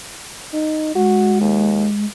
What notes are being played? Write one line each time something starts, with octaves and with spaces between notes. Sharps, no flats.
D#4
G#3 F#4
D#2